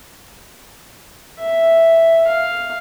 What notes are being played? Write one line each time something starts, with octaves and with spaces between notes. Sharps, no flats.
E5
F5